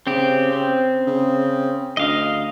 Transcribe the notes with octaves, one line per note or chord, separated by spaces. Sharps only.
C#3 C4 G4
C4
C#3
D2 D#5 F5